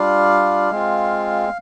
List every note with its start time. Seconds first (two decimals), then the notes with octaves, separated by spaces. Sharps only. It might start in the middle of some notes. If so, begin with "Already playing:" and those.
Already playing: G3 D4 F4 F5
0.71 G#3 C4 F4